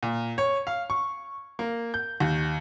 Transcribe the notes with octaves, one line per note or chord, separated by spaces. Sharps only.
A#2
C#5
F5
C#6
A#3
G6
D#2